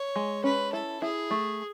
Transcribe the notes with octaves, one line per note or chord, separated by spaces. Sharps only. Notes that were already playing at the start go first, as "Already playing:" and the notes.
Already playing: C#5
G#3
C#4 B4
E4 A4
E4 G#4
A3